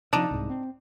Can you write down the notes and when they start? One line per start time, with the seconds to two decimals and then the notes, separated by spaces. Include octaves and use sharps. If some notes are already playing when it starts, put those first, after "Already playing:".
0.13 C3 F3 D4 D#4
0.31 C2 G#2
0.50 C4